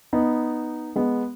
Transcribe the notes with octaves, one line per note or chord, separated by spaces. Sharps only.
B3 D#4
G#3 B3